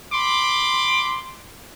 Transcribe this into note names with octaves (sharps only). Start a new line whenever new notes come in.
B5 C6 D6